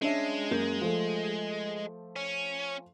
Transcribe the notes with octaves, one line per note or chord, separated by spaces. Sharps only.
G#3 C#4 D4 E5
F#2 A#3 G6
F3 A3
C#4